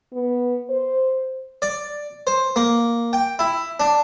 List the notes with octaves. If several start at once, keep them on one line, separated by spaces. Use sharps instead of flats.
B3
C5
D5
C5
A#3
G5
E4
D4